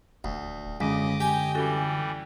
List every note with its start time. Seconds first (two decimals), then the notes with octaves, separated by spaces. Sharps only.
0.24 D#1 D2
0.80 C#2 F#2 D3 G#3 C#4 D#5 D6
1.20 G4 G#5
1.55 E3 G3 C#4 F#4 A4